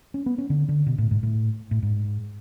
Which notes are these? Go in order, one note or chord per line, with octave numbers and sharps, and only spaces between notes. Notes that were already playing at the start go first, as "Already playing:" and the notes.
C#4
B3
C#4
D3
D3
B2
A2
G#2
A2
A2
G#2